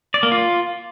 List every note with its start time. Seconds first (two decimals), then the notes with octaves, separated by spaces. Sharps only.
0.14 D5
0.23 A#3
0.32 F4